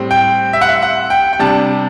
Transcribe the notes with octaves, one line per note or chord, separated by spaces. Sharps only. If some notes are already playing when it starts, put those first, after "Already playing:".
Already playing: A2 G3 C4
G5
E5
F#5
E5
F#5
G5
G5
C3 G3 D4 A5